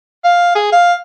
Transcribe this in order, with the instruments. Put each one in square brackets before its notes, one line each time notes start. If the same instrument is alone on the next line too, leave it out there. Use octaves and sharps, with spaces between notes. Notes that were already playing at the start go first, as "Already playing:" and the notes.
[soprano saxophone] F5
G#4
F5